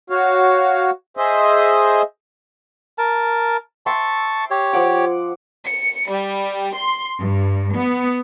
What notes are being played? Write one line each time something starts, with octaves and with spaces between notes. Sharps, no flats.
F#4 C#5 F5
G#4 C5 D#5 E5
A#4 A5
E5 G5 A5 C6 C#6
G4 C#5
F3 F#5 D6
C#7
G3
C6
G2
B3